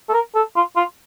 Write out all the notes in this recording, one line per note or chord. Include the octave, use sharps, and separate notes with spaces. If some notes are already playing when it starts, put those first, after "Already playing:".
A4
A#4
A4
F4
F4